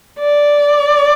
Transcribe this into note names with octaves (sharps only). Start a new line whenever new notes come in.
D5